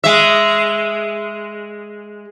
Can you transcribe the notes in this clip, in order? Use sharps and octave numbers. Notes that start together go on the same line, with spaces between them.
G#3 E5